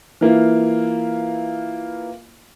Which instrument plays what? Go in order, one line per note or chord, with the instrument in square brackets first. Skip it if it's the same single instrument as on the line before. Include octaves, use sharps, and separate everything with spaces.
[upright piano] E3 A#3 E4 F4